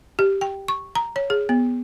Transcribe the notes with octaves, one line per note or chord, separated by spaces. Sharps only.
G4
G5
C#6
A#5
C#5
G#4
B3